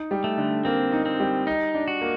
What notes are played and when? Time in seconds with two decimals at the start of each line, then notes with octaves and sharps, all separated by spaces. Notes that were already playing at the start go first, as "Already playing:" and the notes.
Already playing: D#4
0.11 G3
0.24 A3
0.37 D3
0.65 A#3 C4
0.92 D#4
1.06 C4
1.20 G3
1.47 D#4 D#5
1.74 D4
1.88 F#4
2.01 A#3